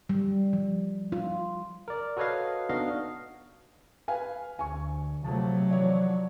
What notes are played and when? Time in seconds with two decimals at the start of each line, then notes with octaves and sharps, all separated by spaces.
0.09 G3
0.53 F3
1.12 F4
1.88 A#4 D5
2.17 F#4 A4 B4 C#5 D#5 F5
2.69 B3 D4 D#4 F#4 D#5 F5
4.08 B4 F5 G#5
4.59 D2 G#5 C#6
5.24 C3 F3 F#3 A3 A5
5.71 E3 F3 C#5 D5